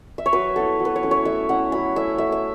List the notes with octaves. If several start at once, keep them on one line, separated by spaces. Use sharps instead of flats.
E5
C#5
F#3 B4
B3 E4 A4
F#3
B4
C#5
A3 C#4 E4
C#5
A3 E5
C#4 E4 F#5
F#3 B5
A3 C#4 E4 E5
A3 E5
E5